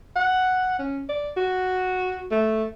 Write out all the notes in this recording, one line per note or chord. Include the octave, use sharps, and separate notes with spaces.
F#5
C#4
D5
F#4
A3